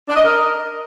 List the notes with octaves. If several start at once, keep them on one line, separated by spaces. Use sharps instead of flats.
D4
D#5
A#4